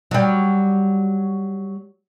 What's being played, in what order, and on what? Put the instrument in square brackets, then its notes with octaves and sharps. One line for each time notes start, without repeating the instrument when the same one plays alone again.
[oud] F#3 G3